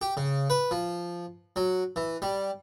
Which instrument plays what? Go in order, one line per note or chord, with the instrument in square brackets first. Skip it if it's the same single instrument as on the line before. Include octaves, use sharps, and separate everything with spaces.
[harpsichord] G4
C#3
B4
F3
F#3
E3
G3